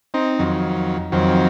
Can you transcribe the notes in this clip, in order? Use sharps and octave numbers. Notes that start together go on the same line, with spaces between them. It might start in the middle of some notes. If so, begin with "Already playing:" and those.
C4 D#4
F2 D#3 F#3
F2 D#3 F#3 C4